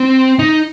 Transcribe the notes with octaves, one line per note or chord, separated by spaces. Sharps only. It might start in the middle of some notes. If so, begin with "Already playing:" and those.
Already playing: C4
D#4